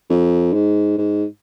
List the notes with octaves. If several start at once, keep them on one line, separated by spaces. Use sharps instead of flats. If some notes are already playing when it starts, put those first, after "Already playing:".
F2
G#2
G#2